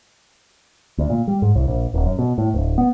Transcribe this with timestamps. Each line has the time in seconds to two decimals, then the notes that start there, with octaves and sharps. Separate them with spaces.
0.98 D2
1.10 A#2
1.28 G3
1.42 G#2
1.55 C2
1.68 A#1
1.94 D#1
2.06 F#2
2.19 B2
2.38 A2
2.54 D1
2.78 B3